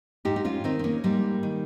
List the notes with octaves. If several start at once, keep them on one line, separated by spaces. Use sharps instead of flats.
G#2 D#4 G4
D#4
C#4 F4
D#3 C4 D#4
C4
A#3 C#4
G#2 G3 A#3
D#3